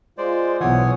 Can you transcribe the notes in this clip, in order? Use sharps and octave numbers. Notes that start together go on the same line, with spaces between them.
G#3 F4 C5 D5
B1 E3 C#5 F#5 G#5 D#6